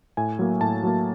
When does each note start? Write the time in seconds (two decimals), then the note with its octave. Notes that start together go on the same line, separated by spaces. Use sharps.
0.17 A2 G#5
0.39 F#3 A#3
0.61 A2 A5
0.83 F#3 A#3